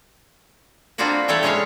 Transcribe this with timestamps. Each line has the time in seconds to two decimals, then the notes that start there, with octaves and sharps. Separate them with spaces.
0.98 A#3 C4 D4 F4 F#4 B4
1.28 E3 G3 A3 A4 B4 C#5
1.43 C3 G#3 C#4 G#4 C#5 F5